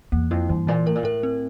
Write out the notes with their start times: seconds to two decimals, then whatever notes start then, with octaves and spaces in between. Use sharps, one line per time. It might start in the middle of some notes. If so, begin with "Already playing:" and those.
0.12 E2 A#3
0.31 F2 E4
0.49 G2 E3
0.67 A#2 E3
0.86 A2 A#4
0.95 A#2
1.03 A2 A#4
1.23 C4